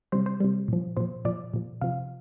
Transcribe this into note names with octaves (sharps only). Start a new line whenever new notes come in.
C3 G3 C5
C5
C3 G3
A#2 F3
A#2 F3 C5
A#2 F3 D5
A#2 F3
C3 F3 F5